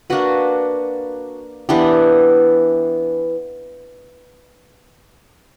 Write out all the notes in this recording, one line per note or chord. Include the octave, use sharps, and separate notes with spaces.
A#3 D4 F#4 B4
E3 B3 D4 G4